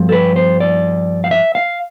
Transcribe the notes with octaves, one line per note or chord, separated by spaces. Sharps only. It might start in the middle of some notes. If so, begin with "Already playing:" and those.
Already playing: G2 F3
A4
B4
C5
D5
F5
E5
F5